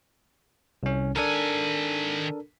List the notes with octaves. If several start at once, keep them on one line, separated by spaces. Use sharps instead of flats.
C2 C#4
D#3 D4 A4 A#4 G#5